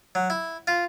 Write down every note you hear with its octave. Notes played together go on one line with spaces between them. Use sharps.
F#3
E4
F4